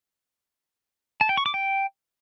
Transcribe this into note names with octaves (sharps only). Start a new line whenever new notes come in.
A5
G5
C#6
D6
G5